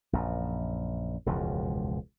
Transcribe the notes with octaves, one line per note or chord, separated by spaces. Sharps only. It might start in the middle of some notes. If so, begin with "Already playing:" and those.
A#1 F#2
E1 C#2 F#2 F3